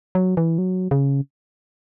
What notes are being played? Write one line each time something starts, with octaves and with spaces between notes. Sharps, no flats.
F#3
E3
F#3
C#3